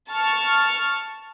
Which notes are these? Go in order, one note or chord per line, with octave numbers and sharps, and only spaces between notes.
A5 C#6 F6